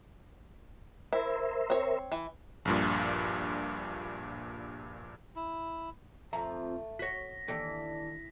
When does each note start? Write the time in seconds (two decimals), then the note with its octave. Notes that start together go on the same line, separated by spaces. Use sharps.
1.13 E4 A#4 C5 E5
1.70 C4 C#5
2.12 E3
2.65 A#1 G2 A#2
5.36 E4
6.33 F2 F3 A3 E5 A#5
6.99 F#4 C#5 A#6 B6
7.48 D#2 E3 D4 A4 G5